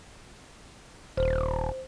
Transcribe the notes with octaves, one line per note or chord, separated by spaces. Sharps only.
D#1 C5